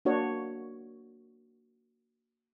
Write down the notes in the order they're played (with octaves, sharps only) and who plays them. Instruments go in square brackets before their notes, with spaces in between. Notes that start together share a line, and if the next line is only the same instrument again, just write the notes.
[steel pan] A#3 D4 F#4 C#5